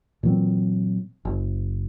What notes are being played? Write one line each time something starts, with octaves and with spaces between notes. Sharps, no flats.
A#2 E3 F#3 C4
F#1